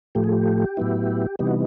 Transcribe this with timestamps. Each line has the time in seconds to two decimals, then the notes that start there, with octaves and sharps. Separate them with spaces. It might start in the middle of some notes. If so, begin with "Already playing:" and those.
0.15 A2 F3 A3 G4
0.24 G#4
0.32 G4
0.77 A2 F#3 B3 E4
1.39 C3 E3 G3 B3 D#4 G4
1.47 F#4